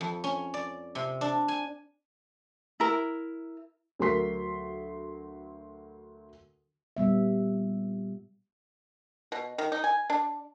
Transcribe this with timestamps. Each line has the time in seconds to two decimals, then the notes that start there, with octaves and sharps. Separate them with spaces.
0.01 F2
0.24 C#4
0.54 D5
0.95 C3
1.21 D4
1.48 G#5
2.80 E4 A#4
3.99 D2 F#3 A#4 C6 B6
6.97 A#2 G3 B3 E5
9.32 B2
9.58 D#3
9.72 D#4
9.84 G#5
10.10 D4